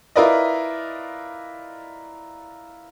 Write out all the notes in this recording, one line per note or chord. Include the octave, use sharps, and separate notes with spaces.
E4 F4 A#4 B4 D5 D#5